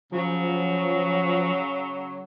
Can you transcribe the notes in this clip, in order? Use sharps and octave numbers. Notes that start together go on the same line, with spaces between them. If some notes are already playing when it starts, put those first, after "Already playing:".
C#3 F3 F#3